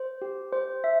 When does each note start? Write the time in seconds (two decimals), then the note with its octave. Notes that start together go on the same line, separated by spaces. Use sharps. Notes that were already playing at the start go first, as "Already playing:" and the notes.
Already playing: C5
0.22 G4
0.53 C5
0.84 E5